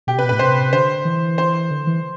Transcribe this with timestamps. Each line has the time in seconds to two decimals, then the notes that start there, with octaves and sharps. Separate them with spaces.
0.07 B2 G4
0.16 C3 B4
0.24 B2
0.29 A2 B4
0.39 C3 C5
0.73 D3 C5
1.05 E3
1.38 C5
1.71 D3
1.87 E3